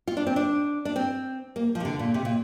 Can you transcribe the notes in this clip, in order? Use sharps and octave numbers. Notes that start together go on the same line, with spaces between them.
F4
D4
C4
D4
D4
C4
A#3
F3
C3
D3
A#2
C3
A#2